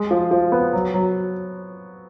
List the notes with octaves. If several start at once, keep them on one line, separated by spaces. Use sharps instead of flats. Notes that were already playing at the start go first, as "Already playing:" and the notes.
Already playing: G#3
F3
F3
B3
F#3
F#3